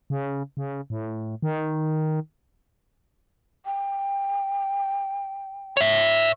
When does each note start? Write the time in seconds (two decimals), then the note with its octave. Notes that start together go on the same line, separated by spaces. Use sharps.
0.10 C#3
0.57 C#3
0.90 A2
1.43 D#3
3.65 G5
5.77 C#5 E5